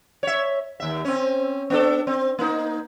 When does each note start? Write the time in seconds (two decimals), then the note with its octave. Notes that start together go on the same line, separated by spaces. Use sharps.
0.23 C#5 E5
0.80 D#2 E5
1.05 C4 C#4
1.70 B3 D4 A4
2.07 C4
2.39 A#3 D#4